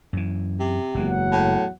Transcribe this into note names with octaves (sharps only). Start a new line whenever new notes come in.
F#2 E3
C3
F#1 E2 F#3 G#3 A#3 F#5
A2